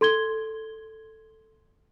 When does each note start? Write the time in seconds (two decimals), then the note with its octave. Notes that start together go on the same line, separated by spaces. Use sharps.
0.01 A4 C6 G#6 G7